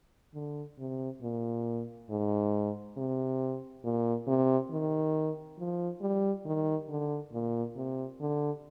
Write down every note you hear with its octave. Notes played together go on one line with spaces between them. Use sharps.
D3
C3
A#2
G#2
C3
A#2
C3
D#3
F3
G3
D#3
D3
A#2
C3
D3